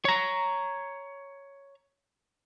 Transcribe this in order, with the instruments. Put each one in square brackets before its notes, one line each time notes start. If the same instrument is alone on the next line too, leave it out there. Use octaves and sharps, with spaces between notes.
[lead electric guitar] C#5 A#5